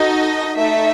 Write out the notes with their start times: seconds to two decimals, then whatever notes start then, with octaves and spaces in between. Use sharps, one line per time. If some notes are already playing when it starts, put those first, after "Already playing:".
Already playing: D#4 F#4 A4 D#5
0.56 A3 D#4 A4 E5